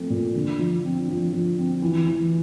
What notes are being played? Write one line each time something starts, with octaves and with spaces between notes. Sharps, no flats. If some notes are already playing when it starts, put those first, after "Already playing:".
Already playing: F3 A3 C4
A#2
D3
F3
C4
F3
F3
C4
E3
E3